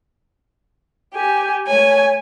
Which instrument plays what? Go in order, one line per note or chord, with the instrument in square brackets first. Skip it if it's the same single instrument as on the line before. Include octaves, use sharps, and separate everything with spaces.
[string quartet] G4 G#5
[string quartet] A3 G#5 [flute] C#5